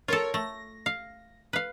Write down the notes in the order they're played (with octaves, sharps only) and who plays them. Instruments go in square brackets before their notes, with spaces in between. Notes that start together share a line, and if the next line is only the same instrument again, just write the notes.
[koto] F4 A4 [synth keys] A#4 C#5
[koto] A3 [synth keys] A#6
[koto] F5
B4 F5